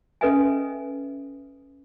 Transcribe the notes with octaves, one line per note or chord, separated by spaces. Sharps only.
C#4 A4 B4 D#5 E5 G#5